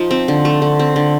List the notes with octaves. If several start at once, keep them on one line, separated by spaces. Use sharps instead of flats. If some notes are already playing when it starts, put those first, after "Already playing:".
Already playing: F3 D#4
C4
D3
A3
D3
C4
D3